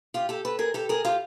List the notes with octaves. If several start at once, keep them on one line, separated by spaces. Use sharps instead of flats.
F4 G4
G4 A4
A4 B4
G#4 A#4
G4 A4
G#4 A#4
F4 G4